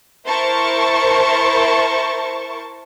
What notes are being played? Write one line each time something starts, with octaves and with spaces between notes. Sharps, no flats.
E4 A#4 C5 A5 C#6